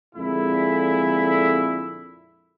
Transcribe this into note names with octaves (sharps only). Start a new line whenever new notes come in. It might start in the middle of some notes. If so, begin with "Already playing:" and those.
F2 A#2 D3 G#3 E4